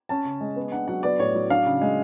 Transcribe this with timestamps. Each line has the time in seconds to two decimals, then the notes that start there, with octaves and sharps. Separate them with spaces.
0.09 C#4 A5
0.25 C#3
0.41 G#3
0.56 B3
0.72 D4 F#5
0.88 F#3 F#5
1.03 B3 D5
1.19 A2 C#5
1.35 F#3
1.50 D4 F5
1.66 C#3
1.81 G#3